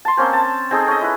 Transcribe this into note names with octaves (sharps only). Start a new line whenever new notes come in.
A5 C6
A#3 C4 C#4 C5
A5
C4 D#4 G#4 A4
C#4 D#5
E4 B4